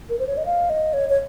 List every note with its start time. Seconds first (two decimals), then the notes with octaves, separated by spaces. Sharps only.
0.09 A#4
0.19 C5
0.27 C#5
0.37 D#5
0.46 F5
0.70 D#5
0.93 C#5
1.10 C#5